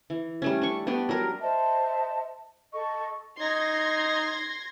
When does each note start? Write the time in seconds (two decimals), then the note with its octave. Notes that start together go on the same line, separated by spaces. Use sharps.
0.10 E3
0.42 G3 A3 C#4
0.62 D4 C#6
0.87 B3 D4 G4
1.09 F#3 G3 A#4
1.41 C5 D#5 E5 A5
2.73 A4 D#5 C#6
3.40 D#4 C6 G#6 A#6